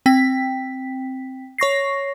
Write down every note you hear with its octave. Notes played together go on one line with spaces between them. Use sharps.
C4 G5 B6
C#5 C#6 A#6 C7